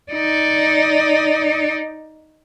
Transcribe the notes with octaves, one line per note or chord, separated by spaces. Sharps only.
D#4 D5